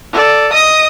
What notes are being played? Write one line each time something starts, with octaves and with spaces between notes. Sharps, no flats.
A4 D5
D#5 D#6